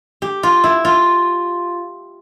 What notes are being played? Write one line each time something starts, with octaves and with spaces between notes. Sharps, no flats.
G4
F4
E4
F4